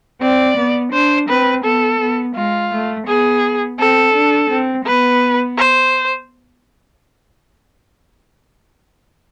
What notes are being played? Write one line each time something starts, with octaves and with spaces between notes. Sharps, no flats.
C4 D5
B3
D4 C5
C4 B4
B3 A4
B3
G#3 F4
A3
B3 G#4
C4 A4
D4
C4
B3 B4
C5